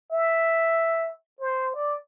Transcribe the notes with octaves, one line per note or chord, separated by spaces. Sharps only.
E5
C5
D5